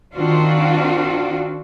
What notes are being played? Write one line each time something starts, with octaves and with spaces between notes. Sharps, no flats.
D#3 C4 D4 F4 F#4